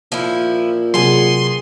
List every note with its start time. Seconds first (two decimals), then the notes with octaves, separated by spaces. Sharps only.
0.12 A#2 F3 E4
0.94 C3 F#3 B3 G#4 C6